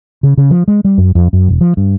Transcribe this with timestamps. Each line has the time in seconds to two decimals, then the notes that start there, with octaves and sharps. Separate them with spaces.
0.23 C#3
0.38 C#3
0.51 F3
0.68 G#3
0.85 G3
0.98 F#2
1.15 F2
1.33 F#2
1.49 E1
1.61 F3
1.77 G2